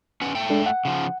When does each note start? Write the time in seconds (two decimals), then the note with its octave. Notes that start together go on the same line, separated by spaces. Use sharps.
0.22 C#4 B4 F#5
0.35 A3 G5
0.50 G#3 D4 A4
0.66 F#5
0.85 C#3 F3